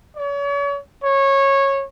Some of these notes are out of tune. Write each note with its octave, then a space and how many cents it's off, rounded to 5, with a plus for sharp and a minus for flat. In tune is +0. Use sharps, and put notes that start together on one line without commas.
C#5 +40
C#5 -15